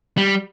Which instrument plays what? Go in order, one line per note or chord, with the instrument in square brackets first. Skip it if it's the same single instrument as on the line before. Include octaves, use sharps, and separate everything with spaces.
[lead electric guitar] G3